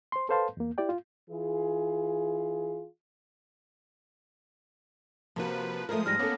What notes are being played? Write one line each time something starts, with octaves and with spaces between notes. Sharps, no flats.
C5 C6
A4 B4 C5 F5 A5 C6
E2 A#3
E4 G4 D5 G5
F4
E3 F4 G#4
C3 F3 A#3 F#4 B4
F3 G#3 A3 A#4 D#6
G#2 G3 F6 A#6
A#3 B3 C#4 A4